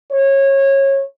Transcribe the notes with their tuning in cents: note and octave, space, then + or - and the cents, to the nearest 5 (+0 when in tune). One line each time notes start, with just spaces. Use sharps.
C#5 -20